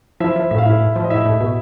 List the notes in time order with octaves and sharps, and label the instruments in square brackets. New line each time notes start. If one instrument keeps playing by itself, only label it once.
[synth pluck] F3 [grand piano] E4 E5
[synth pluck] F3
[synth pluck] A2 [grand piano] E5
[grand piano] F5
[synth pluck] A2 [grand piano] E4 E5
[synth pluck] A2
F3
[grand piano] D#5
[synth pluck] A2 [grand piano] E4 E5
[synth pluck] A2
B2